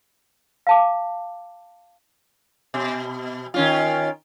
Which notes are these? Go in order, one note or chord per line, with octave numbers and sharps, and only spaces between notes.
F5 A5 D6
B2
D#3 C#4 F4